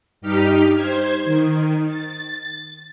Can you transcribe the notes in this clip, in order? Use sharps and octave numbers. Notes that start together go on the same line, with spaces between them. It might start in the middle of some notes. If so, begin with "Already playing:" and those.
G2 D#4 G4 F6 B6
C5 G#6
D#3
A6